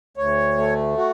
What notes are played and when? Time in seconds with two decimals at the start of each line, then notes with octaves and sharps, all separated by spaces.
0.17 D2 C#5
0.58 A3
0.97 F#4